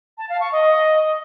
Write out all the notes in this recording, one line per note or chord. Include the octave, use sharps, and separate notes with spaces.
A5
F5
C#6
D#5